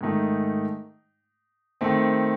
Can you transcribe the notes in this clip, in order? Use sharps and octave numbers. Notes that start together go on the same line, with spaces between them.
G#2 D#3 A3 D#4
D#3 A3 C4